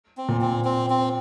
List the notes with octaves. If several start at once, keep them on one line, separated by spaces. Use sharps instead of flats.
C4
A#2
C4
C4
C4